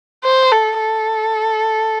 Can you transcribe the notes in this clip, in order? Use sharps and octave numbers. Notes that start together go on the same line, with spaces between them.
C5
A4
A4